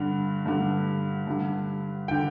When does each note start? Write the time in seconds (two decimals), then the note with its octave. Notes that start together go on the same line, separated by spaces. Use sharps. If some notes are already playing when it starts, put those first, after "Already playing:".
Already playing: G2 D3
0.46 G2 D3
1.27 G2 D3
2.08 D3 G5